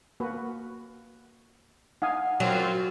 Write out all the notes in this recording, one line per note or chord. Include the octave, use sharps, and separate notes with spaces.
A#3 F#4 B4
D#4 F5 F#5 G#5 D#6
F#2 F#3 C4 F4 G4